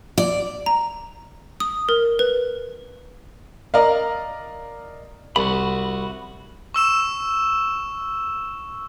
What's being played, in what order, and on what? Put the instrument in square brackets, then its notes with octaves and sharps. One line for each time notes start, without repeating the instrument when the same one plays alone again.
[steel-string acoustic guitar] D5
[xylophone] A#5
D#6
A#4
B4
[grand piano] A#4 D5 D#5 F5
[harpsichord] C2 [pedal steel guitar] F#4 B5
[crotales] C#6 E6 E7